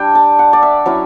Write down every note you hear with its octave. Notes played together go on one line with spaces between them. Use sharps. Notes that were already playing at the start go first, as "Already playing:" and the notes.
Already playing: G3 D4 G5
A5
F#5
D5
E5
F#3 C#4 E4